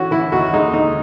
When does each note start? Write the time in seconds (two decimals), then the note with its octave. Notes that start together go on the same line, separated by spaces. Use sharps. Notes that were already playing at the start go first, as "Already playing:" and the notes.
Already playing: E3 C#4 F#4
0.11 E3 E4
0.32 D#2 F#4
0.53 G#3 D#4
0.73 D#2 D#4